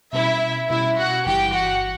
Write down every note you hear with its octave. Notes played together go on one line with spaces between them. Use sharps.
B2 G3 C#4 E4 E5
B2 G3 C#4 E4 E5
F#4 F#5
G1 G2 E3 G4 G5
F#4 F#5